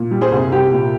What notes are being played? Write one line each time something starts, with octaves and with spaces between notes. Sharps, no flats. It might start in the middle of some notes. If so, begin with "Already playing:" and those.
Already playing: A#2
G3
G#4 C5
C2
C2 G4
A#2